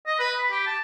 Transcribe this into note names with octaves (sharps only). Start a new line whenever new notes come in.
D#5
B4
B5
G4
A5